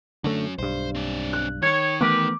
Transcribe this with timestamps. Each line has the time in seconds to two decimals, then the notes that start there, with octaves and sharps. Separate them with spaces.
0.24 D3 F#3 A3 C#4
0.58 B1 G2 C5
0.95 C4 D4
1.33 F#6
1.62 D#3 C#5 G#6 C#7
2.01 E3 A3 B3 G4 A#4 B4 D6